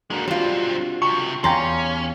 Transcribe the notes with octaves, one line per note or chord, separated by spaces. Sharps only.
G#3 A#3 D4 F#4
B1 G3 C4 F4
C#2 C3 C#6
E2 C#4 D5 F5 G5 A#5 C6